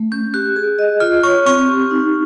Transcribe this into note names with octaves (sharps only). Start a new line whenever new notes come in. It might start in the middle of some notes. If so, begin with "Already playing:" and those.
Already playing: A3
C#4 G6
G4 F#6
G#4
D#5
F4 F6
C#5 C#6
C4 C#6
G4
D#4